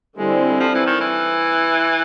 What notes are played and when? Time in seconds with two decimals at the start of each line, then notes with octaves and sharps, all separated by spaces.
0.18 D3 G3 G#3 C4 E4
0.60 F3
0.75 E3
0.87 D#3
1.01 E3